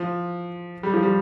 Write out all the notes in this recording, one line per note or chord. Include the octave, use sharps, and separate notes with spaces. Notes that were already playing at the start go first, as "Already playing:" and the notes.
Already playing: F3
G3
F3
G3